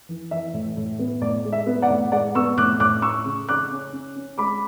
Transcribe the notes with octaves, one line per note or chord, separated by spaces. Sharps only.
E3
E3 E5
A2
A2
B3
A2 D5
G#3
E5
B3
D5 F#5
A2
G#3 D5 F#5
B3 C#6 E6
A2 D6 F#6
A2 D6 F#6
C#4 C#6 E6
C#3
C#3 D6 F#6
C#4
C#4
C#4
G#3 B5 D6